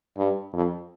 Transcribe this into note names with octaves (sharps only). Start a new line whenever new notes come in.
G2
F2